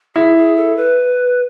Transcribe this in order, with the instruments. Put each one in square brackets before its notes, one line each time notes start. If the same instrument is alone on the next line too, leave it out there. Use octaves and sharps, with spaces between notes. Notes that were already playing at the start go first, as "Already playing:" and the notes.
[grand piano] E4 [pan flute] G#4
[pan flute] G#4
A4
B4